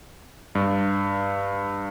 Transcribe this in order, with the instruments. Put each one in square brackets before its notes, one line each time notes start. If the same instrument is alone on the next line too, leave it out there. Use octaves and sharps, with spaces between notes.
[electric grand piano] G2